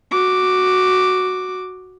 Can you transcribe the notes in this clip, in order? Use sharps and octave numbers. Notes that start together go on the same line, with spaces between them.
F#4 D6